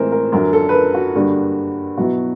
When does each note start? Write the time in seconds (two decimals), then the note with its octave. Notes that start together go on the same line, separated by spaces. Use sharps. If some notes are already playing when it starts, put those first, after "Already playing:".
Already playing: A2 E3 G#3 C4 A#4 C5
0.12 A#4
0.32 F#2 D3 F#3 A#4
0.53 A4
0.69 B4
0.74 A#4
0.94 F#4
1.15 G2 D3 G3 A#3
1.97 B2 F#3 B3 E4 F#4